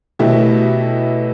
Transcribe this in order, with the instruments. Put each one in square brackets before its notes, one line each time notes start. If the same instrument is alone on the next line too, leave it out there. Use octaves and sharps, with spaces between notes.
[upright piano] B2 F#3 A3 E4 G4